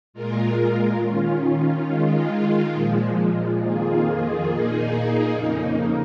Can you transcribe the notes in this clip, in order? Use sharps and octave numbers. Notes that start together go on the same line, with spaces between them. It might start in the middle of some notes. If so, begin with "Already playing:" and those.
A#2 G#3 F4 A#4
D#3 C#4 F4
D#3 G#3 F4
A#2 F3 G#3
F2 D#3 A#3 F4 G#4
A#2 A#3 D#4 G#4
F2 C#3 A#3 D#4